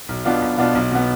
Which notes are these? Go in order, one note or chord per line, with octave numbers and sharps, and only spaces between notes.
B1
B2 B3 D4 F4
B1
B2 B3 D4 F4
B1
B2 B3